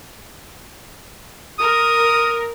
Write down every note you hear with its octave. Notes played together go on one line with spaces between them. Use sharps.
A#4 D#6